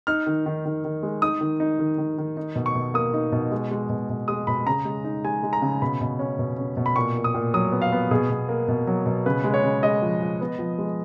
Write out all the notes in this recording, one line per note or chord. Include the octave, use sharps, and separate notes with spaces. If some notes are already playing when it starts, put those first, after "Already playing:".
D#4 F6
D#3
D#3
D#3
D#3
G#3
D#4 D#6
D#3
D#4
D#3
D#3
D#3
D#4
B2
C#6
B2
A#3 D#6
D#4
B2
G#3
G#3
B2
B2
G#3 D#6
B2 B5
C#3 A#5
G#3
D#4
G#3 G#5
G#3
A#5
C#3
B2 B5
B2
C#4
B2
C#4
B2
B5
A#2 C#6
A#2
D#6
A#2
F#3 D#6
B3
F5
B3
B2 G#4
B2
A#3
B2
F#3
B2
C#3 B4
G#3
C#5
C#3
G#3 D#5
F3
F3
B3
F3
G#3